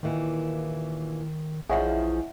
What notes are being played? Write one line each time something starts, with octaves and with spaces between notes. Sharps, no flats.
D#2 A#2 D#3 E3
A#1 E2 F3 G#4 C#5 D#5 E5 F#5